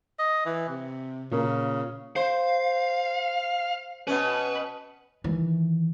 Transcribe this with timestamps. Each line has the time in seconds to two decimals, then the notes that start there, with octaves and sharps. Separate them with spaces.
0.19 D#5
0.45 E3
0.68 C3
1.32 A#2 C#3 A#3 A#4
2.16 C5 F5
4.07 B2 C#4 B4
5.24 D#3 E3